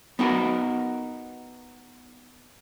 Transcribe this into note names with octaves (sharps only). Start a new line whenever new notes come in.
B3 D#4 F#4 A#4